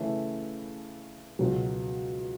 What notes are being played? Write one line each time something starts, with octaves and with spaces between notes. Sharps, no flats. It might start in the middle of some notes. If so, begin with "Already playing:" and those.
Already playing: C#3 E3 A3 E4
C#2 B2 F#3